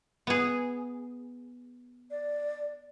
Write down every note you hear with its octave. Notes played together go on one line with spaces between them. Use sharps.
B3 G#4
D5